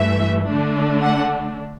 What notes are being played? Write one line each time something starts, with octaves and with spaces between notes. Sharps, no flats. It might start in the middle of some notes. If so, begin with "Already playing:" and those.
Already playing: G2 E3 A3 E5
D3 A3 D4
F#5